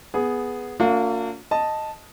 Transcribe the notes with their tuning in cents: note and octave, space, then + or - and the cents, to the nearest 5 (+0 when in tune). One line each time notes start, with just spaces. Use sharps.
B3 +0 G#4 +0
A#3 -35 D4 -40 F4 +40
D#5 +0 A5 +0